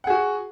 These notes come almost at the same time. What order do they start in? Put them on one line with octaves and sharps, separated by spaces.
F#5 G#4 F#4